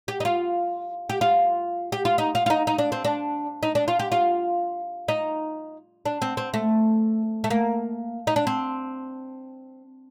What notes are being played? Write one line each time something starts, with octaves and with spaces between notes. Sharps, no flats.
G4
D#4
F4
G4
F4
G4
F4
D#4
F4
F4
D#4
D#4
D4
C4
D4
D#4
D4
F4
G4
F4
D#4
D4
C4
C4
A3
A3
A#3
D#4
D4
C4